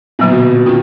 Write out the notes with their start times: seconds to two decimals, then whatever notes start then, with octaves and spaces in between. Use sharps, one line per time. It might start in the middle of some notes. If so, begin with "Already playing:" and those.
0.19 A#2 D3 F#3 B3
0.31 B2
0.42 B2
0.54 B2
0.66 D#3 C#4 F4